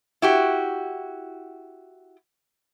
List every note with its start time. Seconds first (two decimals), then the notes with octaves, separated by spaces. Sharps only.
0.22 E4 F#4 G4